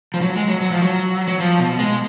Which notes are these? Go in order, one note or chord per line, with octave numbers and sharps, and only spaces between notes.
F3
F#3
G#3
F#3
F#3
F3
F#3
F#3
F3
B2
G#3